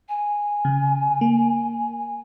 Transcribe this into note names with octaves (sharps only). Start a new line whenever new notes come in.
G#5
C#3
A#3